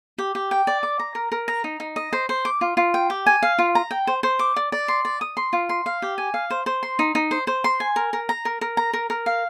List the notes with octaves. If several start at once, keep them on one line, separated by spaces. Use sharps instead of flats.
G4
G4
G5
D5
D6
A#5
A#4
A#4
A#5
D#4
D#4
D#5
C5
C5
D6
F4
F4
G5
G4
G#5
F5
F4
A#5
G5
C5
C5
D6
D5
D5
C6
D5
D#6
C6
F4
C6
F5
G4
G#5
F5
C5
C5
C6
D#4
D#4
C5
C5
C6
G#5
A#4
A#4
A#5
A#4
A#4
A#5
A#4
A#4
F5